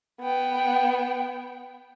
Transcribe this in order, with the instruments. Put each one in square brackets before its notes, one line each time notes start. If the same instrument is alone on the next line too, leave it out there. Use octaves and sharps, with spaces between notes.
[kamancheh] B3 G5